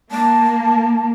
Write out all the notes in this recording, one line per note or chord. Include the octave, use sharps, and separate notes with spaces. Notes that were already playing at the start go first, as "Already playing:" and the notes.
A#3 A5